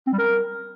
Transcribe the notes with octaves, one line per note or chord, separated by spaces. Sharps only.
C4
G3
A#4